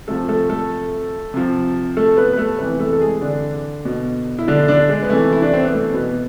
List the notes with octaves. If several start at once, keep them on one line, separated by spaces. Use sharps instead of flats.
C3 F3 A3 A4
A3 A4
A3 A4
C3 F3
A3 A4
B3 B4
B4
A3 A4
C3 E3 B3 B4
A3 A4
A4
G#3 G#4
D3 D4
B2
E4
D3 D4
D3 D4
G#3
B3
C3 E3 A3
E4
D4
C4
B3
A3
B2 B3